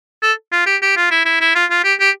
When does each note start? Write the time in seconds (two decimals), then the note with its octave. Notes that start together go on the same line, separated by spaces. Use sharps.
0.22 A4
0.52 F4
0.66 G4
0.82 G4
0.97 F4
1.11 E4
1.25 E4
1.41 E4
1.55 F4
1.70 F4
1.84 G4
2.00 G4